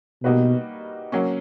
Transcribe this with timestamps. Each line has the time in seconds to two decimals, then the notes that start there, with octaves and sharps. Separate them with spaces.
0.24 B2 G3 A#3 D#4 F#4 B4
1.12 F#3 A#3 C#4